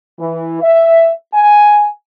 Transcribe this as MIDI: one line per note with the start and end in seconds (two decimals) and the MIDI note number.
0.19 0.60 52
0.62 1.10 76
1.34 1.87 80